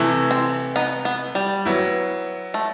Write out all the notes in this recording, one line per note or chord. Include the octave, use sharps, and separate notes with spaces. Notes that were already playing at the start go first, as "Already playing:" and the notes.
Already playing: C3 E3 A3 E4
C4
B3 D#4
B3
G3
F#3 B3 E4
A3